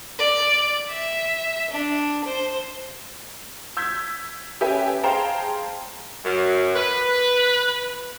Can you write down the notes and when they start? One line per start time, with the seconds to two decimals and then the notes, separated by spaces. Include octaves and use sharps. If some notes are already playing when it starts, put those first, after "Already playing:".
0.19 D5
0.89 E5
1.71 D4
2.25 C5
3.77 E6 G6 G#6 B6
4.61 C#4 G4 A4 B4 E5 G#5
5.04 G#4 C5 F5 G5 A5 A#5
6.25 F#2
6.75 B4